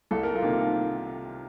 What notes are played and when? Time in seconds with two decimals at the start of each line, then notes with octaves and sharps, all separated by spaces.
0.11 C2 A4
0.23 A#4
0.35 F4 A4
0.42 C3 D#3 A#3